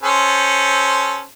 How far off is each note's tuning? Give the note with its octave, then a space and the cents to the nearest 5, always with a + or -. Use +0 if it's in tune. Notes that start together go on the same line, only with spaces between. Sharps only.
C#4 +0 A4 -15 C5 +0